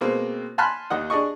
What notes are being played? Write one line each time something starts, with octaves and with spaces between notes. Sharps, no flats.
B2 G#3 A#3 C4
G#5 A5 B5 C6 F6 F#6
D#2 D#3 D#5 F#5
D4 G#4 D5 D#5 C#6